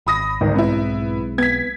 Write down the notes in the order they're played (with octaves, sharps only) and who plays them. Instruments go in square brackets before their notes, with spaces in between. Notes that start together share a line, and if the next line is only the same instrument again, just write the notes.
[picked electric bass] G#1 [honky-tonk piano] B5 D#6 A#6
[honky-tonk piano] G1 D#3 [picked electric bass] C#2 [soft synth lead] G#2
[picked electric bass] B1 G#3 C4 [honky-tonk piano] B3 E4
[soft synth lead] B3 [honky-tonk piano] G#6 B6